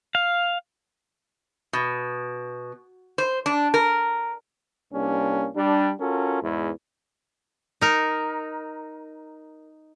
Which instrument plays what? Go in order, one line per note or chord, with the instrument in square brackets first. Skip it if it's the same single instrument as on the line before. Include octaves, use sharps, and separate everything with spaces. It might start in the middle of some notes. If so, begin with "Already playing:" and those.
[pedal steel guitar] F5
[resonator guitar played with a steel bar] B2
C5
D4
A#4
[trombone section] C2 G3 A#3 C#4 D4
G3 D4
C#4 F4 F#4 A4 A#4
E2 G#2
[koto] D#4 A#4